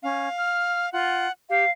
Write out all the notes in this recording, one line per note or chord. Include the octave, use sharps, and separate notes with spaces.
C#4 F5
F6
F4 F#5
G4 F5